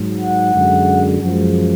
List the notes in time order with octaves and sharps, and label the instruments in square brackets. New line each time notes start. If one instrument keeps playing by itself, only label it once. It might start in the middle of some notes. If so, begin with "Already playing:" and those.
Already playing: [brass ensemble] G#2 F#3
F#5
F#2 D3 G#3
F#2 F3 G#3